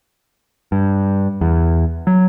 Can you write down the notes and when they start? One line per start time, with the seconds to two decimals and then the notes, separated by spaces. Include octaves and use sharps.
0.72 G2
1.41 E2
2.07 F#3